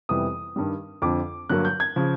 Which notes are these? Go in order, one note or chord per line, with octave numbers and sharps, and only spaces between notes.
F2 C3 E3 G3 B3 D#6
G2 D#3 G3
F2 D3 F3 D6
G2 D3 F#3 A#3 F#6
G6
G#6
C#3 F3